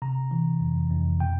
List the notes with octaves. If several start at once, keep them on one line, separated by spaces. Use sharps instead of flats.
C3 A#5
E3
F2
F2
B2 G5